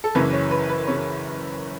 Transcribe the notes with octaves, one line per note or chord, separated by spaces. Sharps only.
A4
F#1 F#2 C#3 E3 B4
C#5
B4
B4
C#3 E3 C#5